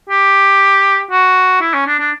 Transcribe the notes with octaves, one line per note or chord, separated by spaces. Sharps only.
G4
F#4
E4
C#4
D4
D4